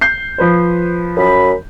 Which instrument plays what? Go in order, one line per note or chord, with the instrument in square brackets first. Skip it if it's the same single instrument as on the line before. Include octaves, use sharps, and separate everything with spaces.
[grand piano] G6 C7
F3 B4 C5
[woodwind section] F#2 B5